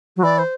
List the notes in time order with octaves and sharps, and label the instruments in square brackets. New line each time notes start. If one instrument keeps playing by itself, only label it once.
[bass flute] F#3
[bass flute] E3 [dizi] D5
[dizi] C5